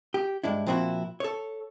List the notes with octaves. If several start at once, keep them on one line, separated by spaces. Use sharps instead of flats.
G4
G2 G#3 D4 E4
A#2 F3 C4 D#4 E4 F#4
A4 C#5